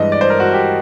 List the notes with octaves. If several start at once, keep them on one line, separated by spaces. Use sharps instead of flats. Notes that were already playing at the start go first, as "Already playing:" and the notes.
Already playing: G2 E3 G#3 D#5
D5
C5
A#4
F#4
G4